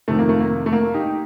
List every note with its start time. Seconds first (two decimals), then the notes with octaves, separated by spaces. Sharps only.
0.08 F2 C3 D#3 A3
0.19 A#3
0.29 A3
0.41 A#3
0.66 A3
0.73 A#3
0.94 D#4 G4